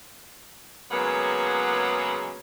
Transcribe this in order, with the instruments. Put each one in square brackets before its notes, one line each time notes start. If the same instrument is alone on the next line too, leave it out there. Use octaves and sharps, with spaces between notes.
[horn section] C#3 F#3 G#3 A#3 B3